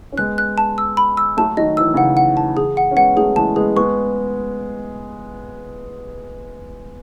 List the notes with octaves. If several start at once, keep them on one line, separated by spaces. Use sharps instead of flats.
C#4
G#3 B3 F#6
F#6
A5
E6
B5
E6
F#3 A3 A5
D#3 F#3 D#5
E3 E6
D#3
C#3 E3 F#5
F#5
A5
C#3 E3 G#4
F#5
C#4
G#3 B3 F#5
F#3 A3 G#4
E3 G#3 A5
G#3 B3 G#4
G#3 B3 C#6